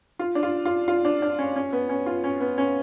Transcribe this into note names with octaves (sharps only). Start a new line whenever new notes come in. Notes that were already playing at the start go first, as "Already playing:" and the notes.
F4
D4
F4
F4
F4
D4
D4
C#4
C#4
B3
C#4
F4
C#4
B3
C#4